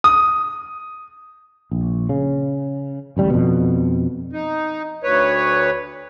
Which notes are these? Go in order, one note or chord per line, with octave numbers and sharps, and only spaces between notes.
D#6
A#1
C#3
D1 A1 G3
F2 B2
D#4
D2 B4 C#5